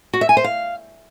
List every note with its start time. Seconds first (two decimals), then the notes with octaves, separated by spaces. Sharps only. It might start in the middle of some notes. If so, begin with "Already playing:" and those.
0.13 F#4
0.21 E5
0.29 G#5
0.37 C5
0.44 F5